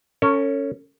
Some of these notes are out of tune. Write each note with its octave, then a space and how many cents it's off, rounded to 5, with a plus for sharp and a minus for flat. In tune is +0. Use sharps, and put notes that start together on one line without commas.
C#4 +0 A4 +40